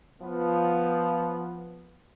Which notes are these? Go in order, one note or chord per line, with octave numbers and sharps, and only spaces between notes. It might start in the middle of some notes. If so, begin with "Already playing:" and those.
F3 B3